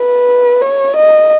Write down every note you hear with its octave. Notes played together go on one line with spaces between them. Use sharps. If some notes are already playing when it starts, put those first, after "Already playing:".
Already playing: B4
C#5
D#5